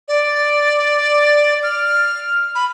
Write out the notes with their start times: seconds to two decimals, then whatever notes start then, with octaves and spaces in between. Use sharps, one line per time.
0.08 D5
1.63 F6
2.55 B5